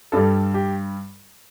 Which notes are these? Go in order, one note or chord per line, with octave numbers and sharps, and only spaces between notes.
G2 G3 A4
G4